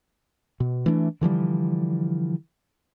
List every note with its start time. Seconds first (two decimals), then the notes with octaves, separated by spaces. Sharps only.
0.60 B2
0.86 E3 A3 C#4 D4
1.21 D3 E3 F3 G3